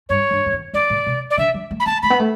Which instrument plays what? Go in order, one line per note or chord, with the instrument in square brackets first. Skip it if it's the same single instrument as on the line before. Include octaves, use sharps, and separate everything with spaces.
[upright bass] G2 [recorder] C#5
[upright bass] G2
F#2
E2
[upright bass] F#2 [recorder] D5
[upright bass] A2
B2
[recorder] D5
[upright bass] D3 [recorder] E5
[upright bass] F#3
A3
[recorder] B5
[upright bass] B3 [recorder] A5
[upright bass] A3 [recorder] B5
[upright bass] B3
A3